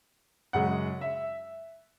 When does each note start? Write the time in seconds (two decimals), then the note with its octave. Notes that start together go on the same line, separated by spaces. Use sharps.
0.53 F#2 C#3 G#3 F#5
1.01 E5